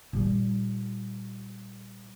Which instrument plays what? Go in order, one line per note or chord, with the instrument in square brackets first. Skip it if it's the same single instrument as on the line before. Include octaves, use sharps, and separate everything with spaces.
[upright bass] A#2 G3